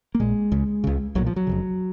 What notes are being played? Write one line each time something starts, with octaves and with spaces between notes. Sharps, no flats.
A#3
A#1 A#2 G#3
C#2 C#3
C#2 C#3
B1 A#2 F#3
F3
F#3
F1 F2 C#3